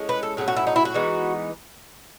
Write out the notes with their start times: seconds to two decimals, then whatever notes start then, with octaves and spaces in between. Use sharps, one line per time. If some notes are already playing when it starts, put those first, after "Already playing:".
Already playing: A2 G#3 C#4
0.09 B4
0.23 A4
0.37 A2 F#3 C#4 G#4
0.48 F#4
0.57 E4
0.67 D#4
0.76 E4
0.85 F#4
0.94 E3 G#3 B3 D#4